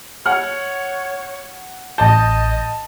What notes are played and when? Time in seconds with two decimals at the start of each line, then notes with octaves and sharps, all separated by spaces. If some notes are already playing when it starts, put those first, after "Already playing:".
0.26 C#5 F#5 F6
1.98 A1 D#5 A5 G6